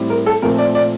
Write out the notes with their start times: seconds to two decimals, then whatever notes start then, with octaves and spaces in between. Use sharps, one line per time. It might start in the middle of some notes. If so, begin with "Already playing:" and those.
Already playing: A2 G3 C4
0.10 A#4
0.26 A4
0.42 A#2 F3 A3 C4 A#4
0.58 D5
0.75 D5